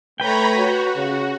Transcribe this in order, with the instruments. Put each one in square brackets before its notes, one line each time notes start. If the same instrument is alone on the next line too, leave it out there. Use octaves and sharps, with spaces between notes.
[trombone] A3 [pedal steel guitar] B4 G5 [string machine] C#5 A#5 B5
[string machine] F#4
[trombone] C#3